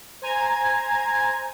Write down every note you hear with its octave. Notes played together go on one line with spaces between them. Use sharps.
C5 G#5 A#5 G#6